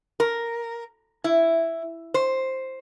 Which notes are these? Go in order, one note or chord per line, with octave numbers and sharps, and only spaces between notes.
A#4
E4
C5